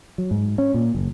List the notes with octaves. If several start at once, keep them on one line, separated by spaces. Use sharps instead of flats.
F#3
G#2
C#4
A#2
F#1